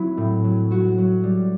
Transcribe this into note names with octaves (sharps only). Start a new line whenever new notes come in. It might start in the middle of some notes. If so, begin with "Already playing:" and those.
Already playing: F#3 C4 E4
A2
F#3
F#3 F#4
F#3
G3